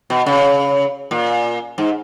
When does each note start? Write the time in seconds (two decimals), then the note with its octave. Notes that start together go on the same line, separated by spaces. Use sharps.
0.10 B2
0.26 C#3
1.11 A#2
1.78 G#2